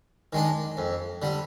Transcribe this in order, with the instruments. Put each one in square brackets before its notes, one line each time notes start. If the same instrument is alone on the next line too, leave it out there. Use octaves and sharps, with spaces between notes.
[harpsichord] D#3 G#3 D4
F2
D3 G3